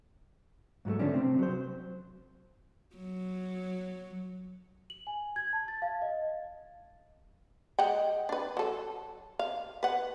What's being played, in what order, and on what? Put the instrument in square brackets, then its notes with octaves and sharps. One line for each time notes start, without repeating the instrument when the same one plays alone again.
[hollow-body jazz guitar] G#2 F#3 G3 A3
D3 F3 G3 A3 C#4 D4
C3 C4
F#3 C5
[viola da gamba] F#3
[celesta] F#7
G#5
G#6
A5
A6
F5
D#5
[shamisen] G#3 F#5 G5
D4 B4
F#3 A4
F5
B4 F#5